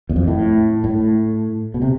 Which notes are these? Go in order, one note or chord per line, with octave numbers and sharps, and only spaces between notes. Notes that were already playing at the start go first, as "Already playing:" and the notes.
E2
F2
A2
A2
B2
C3